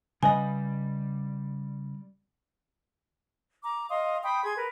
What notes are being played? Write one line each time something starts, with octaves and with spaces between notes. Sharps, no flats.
C#3 G3 B4 D#5 G#5
A#5 D6
D#5 F5 C6 D#6
G5 B5 C6 D#6
G#4 C6 G#6
A#4 B4